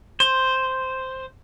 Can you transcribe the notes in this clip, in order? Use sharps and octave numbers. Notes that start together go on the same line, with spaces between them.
C5